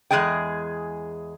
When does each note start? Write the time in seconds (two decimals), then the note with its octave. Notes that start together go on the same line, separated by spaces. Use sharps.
0.11 E2 F3 G#3 G#4 D#5 G5